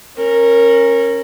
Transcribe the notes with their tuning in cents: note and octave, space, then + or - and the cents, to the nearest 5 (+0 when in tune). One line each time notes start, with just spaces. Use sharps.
C#4 -20 A#4 +0